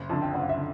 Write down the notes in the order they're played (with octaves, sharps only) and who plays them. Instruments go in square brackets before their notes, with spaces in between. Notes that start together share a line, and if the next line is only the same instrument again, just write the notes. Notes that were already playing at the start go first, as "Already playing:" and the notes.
Already playing: [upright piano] F#1
[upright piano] F2 D3 [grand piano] A5
[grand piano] G5
[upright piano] F#1 [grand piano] F#5
[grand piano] F5
E5
[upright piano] D3